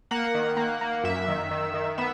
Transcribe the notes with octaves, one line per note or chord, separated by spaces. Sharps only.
A#3 F#5
D#3
A#3
A#3
F#2 E5
D#3
D#3
D#3
B3 E5